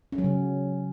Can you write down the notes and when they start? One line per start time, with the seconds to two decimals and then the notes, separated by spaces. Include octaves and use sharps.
0.12 C#4
0.18 F#3
0.24 C#3